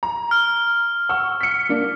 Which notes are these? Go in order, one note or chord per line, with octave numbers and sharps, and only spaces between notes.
A#5
F6
F#5 C#6 E6
B6 C#7
A#3 D4